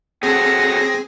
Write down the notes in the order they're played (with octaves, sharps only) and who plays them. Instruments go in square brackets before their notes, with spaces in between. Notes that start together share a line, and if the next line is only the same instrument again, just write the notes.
[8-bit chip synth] C4 G#4 [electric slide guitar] C#4 F#4 A4 [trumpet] F#5 [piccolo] A#6